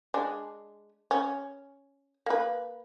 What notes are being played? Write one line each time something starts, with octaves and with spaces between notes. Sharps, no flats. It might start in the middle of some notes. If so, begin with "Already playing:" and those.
G#3 D4
C#4
A#3 B4